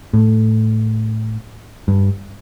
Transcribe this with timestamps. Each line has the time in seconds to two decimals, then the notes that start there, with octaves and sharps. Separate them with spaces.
0.13 A2
1.88 G2